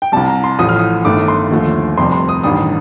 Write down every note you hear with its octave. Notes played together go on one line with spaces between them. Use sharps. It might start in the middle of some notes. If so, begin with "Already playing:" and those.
G5
C2 C3 G3 A5
A#5
C6
A1 A2 F3 A3 D#6
F6
D#6
G1 G2 D#3 A3 D6
C6
D#2 D3 F3 A3
F1 F2 C3 G3 C6
C6
D#6
A1 G2 D#3 G3 D#6